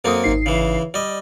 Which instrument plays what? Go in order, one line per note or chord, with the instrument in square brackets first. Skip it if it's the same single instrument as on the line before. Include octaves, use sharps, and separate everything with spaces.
[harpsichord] F#2 A#3 C4 [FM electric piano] A4 D#6
[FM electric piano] G#1 D#4 C7
[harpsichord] C#3 E3
[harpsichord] G3 D#5 [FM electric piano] D5